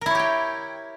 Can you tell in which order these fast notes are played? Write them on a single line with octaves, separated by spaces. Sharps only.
A#4 E4 C#5 G4 G5